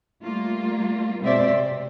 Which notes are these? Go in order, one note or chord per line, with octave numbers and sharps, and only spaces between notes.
G3 A3 A#3 F4
B2 G#3 C4 C5 D5 E5
C3